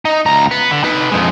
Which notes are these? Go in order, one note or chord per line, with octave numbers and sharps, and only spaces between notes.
D#4
C#2 A#5
B3
D3
D#4 B4
F2 G#3